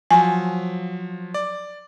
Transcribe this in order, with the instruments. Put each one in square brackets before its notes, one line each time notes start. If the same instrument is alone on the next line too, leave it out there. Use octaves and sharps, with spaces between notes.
[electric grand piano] F3 F#3 [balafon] G#5
[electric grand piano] D5